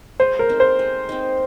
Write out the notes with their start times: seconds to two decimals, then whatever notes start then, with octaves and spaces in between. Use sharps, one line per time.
0.20 G#3 C5
0.39 A#4
0.49 C4 D#4
0.60 C5
0.79 G#3
1.09 C4 D#4